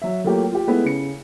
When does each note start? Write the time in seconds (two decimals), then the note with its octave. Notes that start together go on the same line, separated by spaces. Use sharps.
0.02 F#3 E5
0.24 F#3 A3 A#3 F4 G4
0.52 F4 G4
0.67 G#3 A3 B3 E4 B4
0.84 C#3 C#7